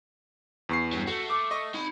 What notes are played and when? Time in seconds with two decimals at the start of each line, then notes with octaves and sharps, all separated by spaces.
0.69 E2 C#6 C7
0.92 G2 F#3
1.07 A3 F#4
1.30 D6
1.51 D#5 C#6
1.74 D#4 B5